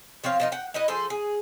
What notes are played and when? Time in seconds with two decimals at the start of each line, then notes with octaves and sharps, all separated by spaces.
0.24 F3 C4 C#5 F5
0.40 F3 D#4 A#4
0.52 F#5 G5
0.74 D#4 E4 B4 D#5
0.88 F3 G#4 A4 C5
1.10 G#4